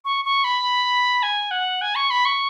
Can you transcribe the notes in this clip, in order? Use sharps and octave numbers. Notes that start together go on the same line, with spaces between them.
C#6
C#6
B5
G#5
F#5
G#5
C#6
B5
C#6